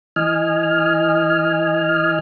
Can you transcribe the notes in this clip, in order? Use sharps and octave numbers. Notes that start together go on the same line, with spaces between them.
E3 D#5 G#5 F6